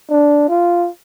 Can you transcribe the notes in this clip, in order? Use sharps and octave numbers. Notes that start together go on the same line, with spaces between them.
D4
F4